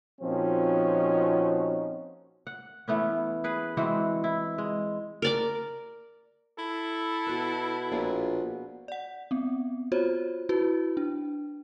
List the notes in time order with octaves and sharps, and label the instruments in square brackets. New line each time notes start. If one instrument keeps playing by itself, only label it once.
[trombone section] A#2 F3 C4 C#4 D#4 F#4
[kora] F#5
E3 A3 B3 C#4
G#4 B4
E3 G#3 C4 F#4
E4
G#3
[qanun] A#4 D5 D6
[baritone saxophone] E4 [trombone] A4
[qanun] B2 B4
[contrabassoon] A#1 [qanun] B3 F4 D5
[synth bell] D5 F#5
B3 C4
F4 F#4 C5 C#5
E4 F#4 B4
D4